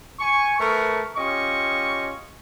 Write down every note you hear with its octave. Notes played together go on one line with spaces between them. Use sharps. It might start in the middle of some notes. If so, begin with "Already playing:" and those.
G#5 C#6
A3 A#4 B4 C#6
C#4 F4 G4 D#5 C#6